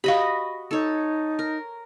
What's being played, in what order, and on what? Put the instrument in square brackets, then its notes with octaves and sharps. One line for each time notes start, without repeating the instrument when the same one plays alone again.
[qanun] F#4 D#5 B5 [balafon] G4 F5
[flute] D#4 [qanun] A4 C#5
[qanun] A#4